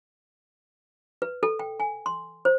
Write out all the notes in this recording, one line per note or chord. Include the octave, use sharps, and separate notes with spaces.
B4
A4
G5
G#5
C6
C5